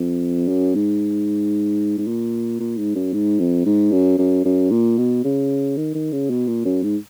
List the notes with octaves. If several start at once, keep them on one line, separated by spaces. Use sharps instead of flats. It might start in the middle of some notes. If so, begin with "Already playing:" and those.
Already playing: F2
F#2
G#2
G#2
A#2
A#2
G#2
F#2
G#2
F2
G#2
F#2
F#2
F#2
A#2
B2
C#3
D#3
D#3
C#3
B2
A#2
F#2
G#2